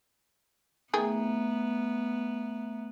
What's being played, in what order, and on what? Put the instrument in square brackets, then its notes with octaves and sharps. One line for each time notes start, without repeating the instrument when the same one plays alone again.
[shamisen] D#3 G#4 G5 [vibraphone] A3 E5 A#5 [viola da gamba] B3